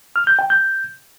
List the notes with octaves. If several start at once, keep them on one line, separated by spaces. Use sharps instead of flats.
F6
G6
G5
G6